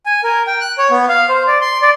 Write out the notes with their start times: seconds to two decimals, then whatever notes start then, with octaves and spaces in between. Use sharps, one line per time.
0.06 G#5
0.24 A#4
0.47 G5
0.61 F#6
0.78 C#5
0.91 B3
1.09 F5
1.29 C5
1.47 D5
1.61 C6
1.82 D5